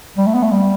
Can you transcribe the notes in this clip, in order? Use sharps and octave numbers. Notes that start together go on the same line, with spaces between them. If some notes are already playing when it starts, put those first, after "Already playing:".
G3
A3
B3
A3
G3